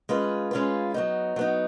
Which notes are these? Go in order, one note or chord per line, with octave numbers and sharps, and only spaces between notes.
G#3 C#4 F4 B4
G#3 C#4 F4 B4
F#3 B3 D#4
F#3 B3 D#4